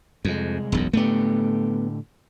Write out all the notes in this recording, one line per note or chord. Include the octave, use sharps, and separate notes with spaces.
C2 F2 G#3
E1 B1 F#2
A2 D3 A3 B3 G4